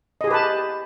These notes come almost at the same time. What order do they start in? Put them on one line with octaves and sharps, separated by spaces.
D#5 G#4 G4 B4 A5